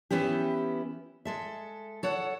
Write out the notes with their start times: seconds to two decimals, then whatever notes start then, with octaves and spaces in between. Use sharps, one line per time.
0.10 E3 B3 C#4 E4 G4
1.25 G#3 A4 E5
2.03 A4 C#5 F#5